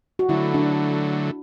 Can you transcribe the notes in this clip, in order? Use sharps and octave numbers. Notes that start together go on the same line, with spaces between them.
F#4
D3 F#3 A3 E4
D4